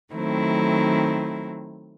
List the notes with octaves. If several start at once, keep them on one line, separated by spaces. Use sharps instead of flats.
D#3 F#3 A3 C4 E4